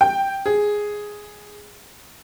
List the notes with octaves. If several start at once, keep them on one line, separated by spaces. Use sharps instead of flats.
G5
G#4